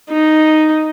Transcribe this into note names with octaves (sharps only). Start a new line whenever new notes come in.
D#4